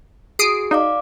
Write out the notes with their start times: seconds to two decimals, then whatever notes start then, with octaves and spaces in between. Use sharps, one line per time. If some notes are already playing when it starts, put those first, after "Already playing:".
0.39 F#4 G#4 D#6 C7 D7
0.71 D#4 D5 F5 D6